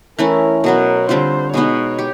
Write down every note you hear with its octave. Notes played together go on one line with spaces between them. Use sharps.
E3 A3 C#4 E4 A#4
B2 F#3 B3 A#4
D3 G3 C4 F4 C5
B2 G#3 B3 D#4 C#5
G4